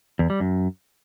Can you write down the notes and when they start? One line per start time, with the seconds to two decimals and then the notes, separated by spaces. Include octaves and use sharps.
0.19 E2
0.30 G3
0.40 F#2